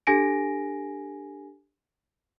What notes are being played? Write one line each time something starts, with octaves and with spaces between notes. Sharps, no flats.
D4 G4 A4 G#5 A#6 D7